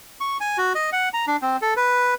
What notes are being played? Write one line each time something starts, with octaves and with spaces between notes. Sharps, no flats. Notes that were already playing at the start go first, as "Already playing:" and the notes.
C#6
G#5
F#4
D#5
F#5
A#5
D4
C4
A4
B4